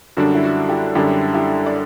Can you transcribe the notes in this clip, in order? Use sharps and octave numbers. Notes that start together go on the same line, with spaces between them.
F#2 D3 G3 D4 F#4
E4
F#4
E4 G4
F#2 D3 G3 D4 E4 G4
E4 G4
D5